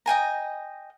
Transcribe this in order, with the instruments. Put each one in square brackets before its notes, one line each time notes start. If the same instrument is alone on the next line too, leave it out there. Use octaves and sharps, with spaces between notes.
[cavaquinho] D#5 G5 G#5 A#5